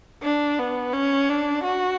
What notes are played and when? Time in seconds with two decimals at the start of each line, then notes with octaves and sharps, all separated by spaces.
0.22 D4
0.59 B3
0.93 C#4
1.29 D4
1.64 F#4